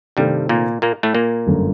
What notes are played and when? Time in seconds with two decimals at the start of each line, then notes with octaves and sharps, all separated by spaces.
0.17 G2 C3 D#3 G3 A3 C4
0.49 A#2 A#3
0.82 A#2 A#3
1.03 A2 A3
1.15 A#2 A#3
1.47 G1 F#2 D3 A3